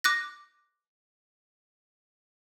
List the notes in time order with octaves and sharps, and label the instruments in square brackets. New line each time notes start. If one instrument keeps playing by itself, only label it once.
[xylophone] D6 F#6 A#6